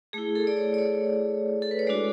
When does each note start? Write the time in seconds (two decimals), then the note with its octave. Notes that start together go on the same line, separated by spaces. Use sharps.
0.13 A3 E4 G#4
0.35 A4
0.47 D5
0.57 C#5
0.74 D5
0.79 C#5
1.62 A4
1.71 B4
1.79 C#5
1.87 G#3 D4 F#4 D5